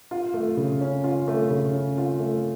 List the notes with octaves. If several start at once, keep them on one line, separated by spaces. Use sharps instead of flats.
F4
A3
C#3
C#4
F4
A3
C#3
C#4
F4
A3